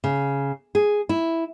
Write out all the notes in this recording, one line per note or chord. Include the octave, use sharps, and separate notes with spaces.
C#3
G#4
E4